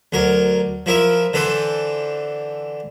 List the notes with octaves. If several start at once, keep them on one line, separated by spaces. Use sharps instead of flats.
D2 F#3 A#4
F3 E4 A#4 E5
D3 E3 A4 B4 C5